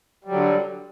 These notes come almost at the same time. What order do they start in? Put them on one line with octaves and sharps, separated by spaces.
G3 F#3 D3